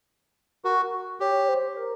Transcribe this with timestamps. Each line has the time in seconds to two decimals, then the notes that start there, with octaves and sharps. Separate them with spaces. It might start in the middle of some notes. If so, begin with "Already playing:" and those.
0.64 F#4 A#4
1.20 G4 C#5
1.49 C5
1.77 A#4